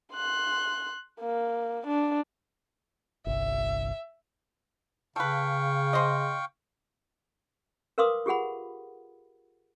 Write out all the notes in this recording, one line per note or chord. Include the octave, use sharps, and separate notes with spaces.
C6 F#6
A#3
D4
G1 C2 E5
C#3 A4 B4 F5 G5 C#6
G#4 C5 D#5
A#4 B4 F5 C6 D6 D#6
F4 G4 G#4 F#5 B5